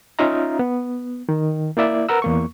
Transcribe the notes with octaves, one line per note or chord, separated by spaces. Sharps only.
C#4 D#4 F4 E5 F5 A#5
B3
D#3
A#3 E4 D5 E5
A#4 B4 F#5 A#5 E6
E2 A#3 C#6